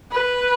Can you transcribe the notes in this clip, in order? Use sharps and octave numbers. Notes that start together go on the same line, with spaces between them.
B4